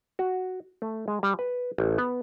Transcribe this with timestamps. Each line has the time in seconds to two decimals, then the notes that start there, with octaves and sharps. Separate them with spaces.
0.19 F#4
0.82 A3
1.08 G#3
1.23 G3
1.39 B4
1.78 A1
1.98 B3